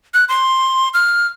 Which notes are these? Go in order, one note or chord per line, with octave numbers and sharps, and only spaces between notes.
F#6
C6
F6